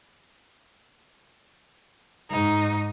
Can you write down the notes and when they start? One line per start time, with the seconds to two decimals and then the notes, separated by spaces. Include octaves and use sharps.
2.31 G#2 D#4